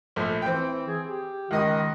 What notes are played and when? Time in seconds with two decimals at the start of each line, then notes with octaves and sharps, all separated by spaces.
0.16 A#1 A3
0.42 E3 C4 G5
0.87 G#4
1.07 G4
1.51 C#2 D#3 D#5 D#6